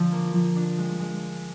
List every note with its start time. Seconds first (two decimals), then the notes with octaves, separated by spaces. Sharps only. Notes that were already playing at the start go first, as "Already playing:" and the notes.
Already playing: D3 F3
0.12 A#3
0.35 F3
0.56 D4
0.78 G#3
1.00 G#3